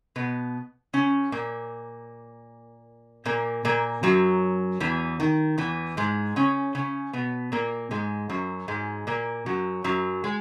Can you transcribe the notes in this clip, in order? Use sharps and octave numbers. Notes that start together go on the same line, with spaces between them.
B2 B3
C#3 C#4
A#2 A#3
A#2 A#3
A#2 A#3
F#2 F#3
E2 E3
D#3
E2 E3
G#2 G#3
C#3 C#4
C#3 C#4
B2 B3
A#2 A#3
G#2 G#3
F#2 F#3
G#2 G#3
A#2 A#3
F#2 F#3
F#2 F#3
G#3